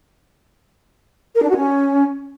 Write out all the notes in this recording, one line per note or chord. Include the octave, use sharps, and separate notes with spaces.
A#4
D4
F#4
C#4